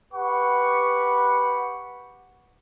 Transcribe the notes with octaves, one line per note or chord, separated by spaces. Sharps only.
G4 B4 F#5 C#6